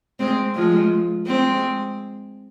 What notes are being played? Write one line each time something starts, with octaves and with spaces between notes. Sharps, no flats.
G#3 C4
F3 G#3
G#3 C4